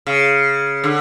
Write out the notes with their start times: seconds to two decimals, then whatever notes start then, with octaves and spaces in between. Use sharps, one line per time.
0.07 C#3
0.84 D3